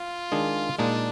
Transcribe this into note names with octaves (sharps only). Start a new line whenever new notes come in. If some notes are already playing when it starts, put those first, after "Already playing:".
Already playing: F4
D#3 G#3 D4 G#4
A#2 G#3 D4 D#4